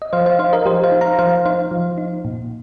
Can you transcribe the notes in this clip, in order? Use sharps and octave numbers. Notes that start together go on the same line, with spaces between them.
D#5
F3 C5 F5
C5 F5
D#4 C5 F5
A#4 D#5
F3 G4 C5
C5 F5
D#4
F5 A#5
F3 C5 F5
D#4 C5 F5
F3
D#4
A#2